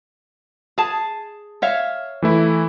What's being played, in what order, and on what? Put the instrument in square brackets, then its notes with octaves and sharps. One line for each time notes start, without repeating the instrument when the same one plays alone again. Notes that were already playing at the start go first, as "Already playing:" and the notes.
[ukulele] G#4 A5
C#5 E5 F5
[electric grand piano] E3 A3 E4